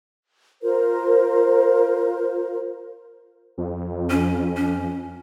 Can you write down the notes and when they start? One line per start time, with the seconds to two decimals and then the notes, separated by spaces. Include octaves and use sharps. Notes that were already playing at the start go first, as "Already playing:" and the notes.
0.62 F4 A#4 C5
3.58 F2
4.10 C#4
4.56 C#4